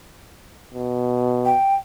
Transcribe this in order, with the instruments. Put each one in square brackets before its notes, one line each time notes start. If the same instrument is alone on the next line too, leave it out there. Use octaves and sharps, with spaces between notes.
[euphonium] B2
[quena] G5